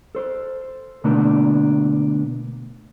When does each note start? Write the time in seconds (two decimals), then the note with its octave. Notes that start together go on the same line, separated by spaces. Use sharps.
0.15 A4 C5
1.04 B2 D3 A3 A#3 D4